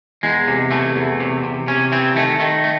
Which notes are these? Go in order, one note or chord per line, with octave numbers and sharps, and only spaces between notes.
E2 G#3
C3
E3 A3
E2
C3
C3
C3 C#4
E3 C4
D#3 A3
D#3 A3
A3